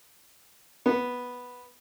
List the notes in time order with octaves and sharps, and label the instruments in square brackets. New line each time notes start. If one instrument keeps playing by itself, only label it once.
[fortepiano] B3